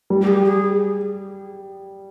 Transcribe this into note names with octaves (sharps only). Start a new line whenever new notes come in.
G3
G4
G#4
G4
G#4